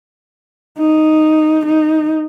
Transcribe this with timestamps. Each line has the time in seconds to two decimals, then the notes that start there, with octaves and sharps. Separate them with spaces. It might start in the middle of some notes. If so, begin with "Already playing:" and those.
0.79 D#4
1.66 D#4